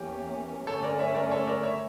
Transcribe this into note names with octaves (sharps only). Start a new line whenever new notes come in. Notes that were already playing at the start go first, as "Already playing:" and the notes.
Already playing: E2 E3 A#3 C#4 G4
G2 D3 A3 C#4 A4 C#5
A#4 D5
C#5 E5
A#4 D5
A4 C#5
A#4 D5
C#5 E5